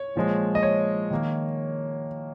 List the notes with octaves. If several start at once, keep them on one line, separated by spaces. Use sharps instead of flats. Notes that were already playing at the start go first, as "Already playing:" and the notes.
Already playing: C#5
A#2 F3 G#3
D#5
C#5
D#3 A#3